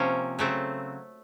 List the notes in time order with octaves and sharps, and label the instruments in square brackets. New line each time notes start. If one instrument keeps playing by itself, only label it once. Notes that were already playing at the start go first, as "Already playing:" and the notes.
Already playing: [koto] C3 F3 A#3 C#4
C#3 F#3 A3 C4